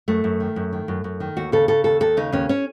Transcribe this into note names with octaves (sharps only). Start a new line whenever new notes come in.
F#2 A3
F#2
D#3
F#2
D#3
F#2
F#2
D#3
D#2 F#4
C#3 A4
C#3 A4
D#2 A4
D#2 A4
C#3 D#4
D#2 C#4
C#4